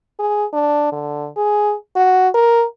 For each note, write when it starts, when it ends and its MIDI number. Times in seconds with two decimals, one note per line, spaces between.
0.19 0.45 68
0.53 0.89 62
0.92 1.28 50
1.37 1.74 68
1.96 2.29 66
2.34 2.65 70